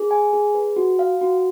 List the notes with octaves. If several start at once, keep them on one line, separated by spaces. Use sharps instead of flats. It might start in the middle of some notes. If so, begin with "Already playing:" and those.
Already playing: G#4
G#5
G#4
B4
F#4
F5
F#4